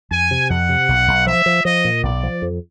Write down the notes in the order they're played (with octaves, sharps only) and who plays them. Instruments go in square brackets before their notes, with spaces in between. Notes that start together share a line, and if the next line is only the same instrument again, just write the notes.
[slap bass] F2 [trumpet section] G#5
[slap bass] C3
[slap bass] F2 [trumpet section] F#5
[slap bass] C3
B1
B1
[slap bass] F3 [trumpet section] E5
[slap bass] F3
[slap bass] F3 [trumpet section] D#5
[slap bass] A#2
[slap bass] B1 [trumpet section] D5
[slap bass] F3
F2